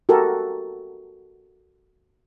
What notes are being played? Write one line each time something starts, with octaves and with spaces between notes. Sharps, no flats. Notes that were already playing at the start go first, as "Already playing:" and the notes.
F#4 G4 A4 A#4